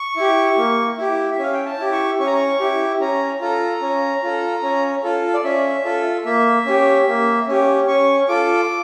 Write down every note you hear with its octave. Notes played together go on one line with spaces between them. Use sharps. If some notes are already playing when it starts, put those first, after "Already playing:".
Already playing: C#6
E4 G4
A#3
E4 G4
E5
C#4 F5
G5
A5
E4 G4
C#6
C#4 C#6
A#5
C#6
E4 G4
C#4 A#5
F4 A4 A#5
C#4
F4 A4
C#4
F4 A4
D5
C#4 E5
F4 A4
A#3 E5
C#4 G4
A#3
C#4 G4
C#4 C#6
F4 A4 D6